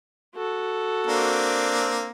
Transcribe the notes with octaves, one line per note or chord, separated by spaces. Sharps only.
F#4 A4
A#3 C4 D4